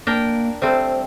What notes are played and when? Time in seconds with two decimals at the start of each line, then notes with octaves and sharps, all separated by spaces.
0.07 A#3 D4 A#4 G5
0.62 G3 A3 C4 C5